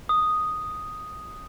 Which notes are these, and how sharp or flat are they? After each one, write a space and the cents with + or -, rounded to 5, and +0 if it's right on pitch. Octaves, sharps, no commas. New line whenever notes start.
D#6 +0